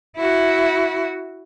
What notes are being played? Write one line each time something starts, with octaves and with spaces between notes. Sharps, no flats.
E4 F#4